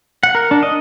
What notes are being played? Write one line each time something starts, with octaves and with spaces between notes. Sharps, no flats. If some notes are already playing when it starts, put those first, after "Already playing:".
F#5
A#4
D4
D#5